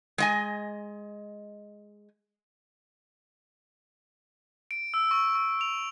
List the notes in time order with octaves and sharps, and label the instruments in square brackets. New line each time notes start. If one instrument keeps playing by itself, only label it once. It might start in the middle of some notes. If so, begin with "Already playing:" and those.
[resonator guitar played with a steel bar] G#3 D#5 G#5
[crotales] D7
E6
C#6
C#6
F7